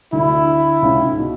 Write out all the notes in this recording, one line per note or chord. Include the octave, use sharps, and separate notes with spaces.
D2 D3 E4
C#2 C#3
G#2
B2